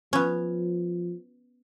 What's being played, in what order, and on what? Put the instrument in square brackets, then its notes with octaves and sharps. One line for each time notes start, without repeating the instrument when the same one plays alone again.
[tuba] F3 [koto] B3 C#4